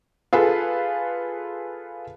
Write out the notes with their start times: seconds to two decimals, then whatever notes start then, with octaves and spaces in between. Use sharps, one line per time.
0.33 F4 G#4 A4 B4